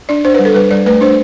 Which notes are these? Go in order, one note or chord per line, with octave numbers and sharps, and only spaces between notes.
D4 D5
D4 C5
G3 B4
A4
G3 B4
G3 D5
A3 B4
D4 C5